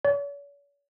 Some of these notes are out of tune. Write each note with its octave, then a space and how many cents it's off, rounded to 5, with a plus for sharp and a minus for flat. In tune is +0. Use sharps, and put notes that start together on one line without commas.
C#5 +45